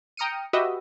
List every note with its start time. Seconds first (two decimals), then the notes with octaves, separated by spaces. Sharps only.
0.17 G5 A#5 D#6 F6 C#7 D#7
0.53 F#4 G4 B4 D#5 E5